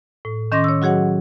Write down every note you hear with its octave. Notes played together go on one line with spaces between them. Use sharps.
A2
D#3 C#4 D#5 C6 D6 A#6
C#5 E6
F#3 F#4 G#4 C#5 F#5